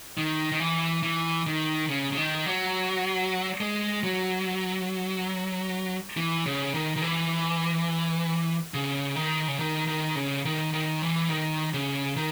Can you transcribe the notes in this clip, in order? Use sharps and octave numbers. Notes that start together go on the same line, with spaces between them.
D#3
D#3
E3
E3
D#3
C#3
C#3
D#3
F#3
G#3
F#3
E3
C#3
D#3
D#3
E3
C#3
D#3
C#3
D#3
D#3
C#3
D#3
D#3
E3
D#3
C#3
D#3